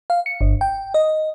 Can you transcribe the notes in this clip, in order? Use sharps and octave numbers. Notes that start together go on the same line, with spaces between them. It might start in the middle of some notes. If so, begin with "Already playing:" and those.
F5
C#7
G1
G5
D#5